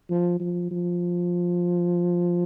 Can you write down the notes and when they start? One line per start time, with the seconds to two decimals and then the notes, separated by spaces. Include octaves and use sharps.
0.10 F3
0.40 F3
0.71 F3